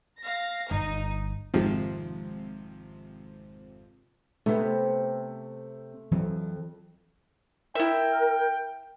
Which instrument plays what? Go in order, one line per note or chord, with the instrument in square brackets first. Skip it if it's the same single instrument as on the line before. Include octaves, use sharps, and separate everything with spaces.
[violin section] F5 A#6
[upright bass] G1 [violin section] D#4
[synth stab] G#1 F2 C3 F3
[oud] C3 B3 [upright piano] A3
[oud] F2 [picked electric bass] E3 F#3 C4
[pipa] E4 E5 [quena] A#4 [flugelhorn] G5